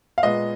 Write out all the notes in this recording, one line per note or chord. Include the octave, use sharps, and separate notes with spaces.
F5
A#2 G#3 B3 D#5